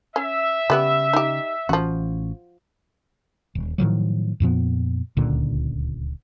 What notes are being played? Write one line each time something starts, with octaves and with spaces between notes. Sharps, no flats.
C#4 E5
C#3 G3 B3 G4
D#4 G4
A1 E3 F3 C#4 F#4
D#1
A2 D#3 F3 F#3
F2 A#2 F3 B3
D1 C#2 A#2 D3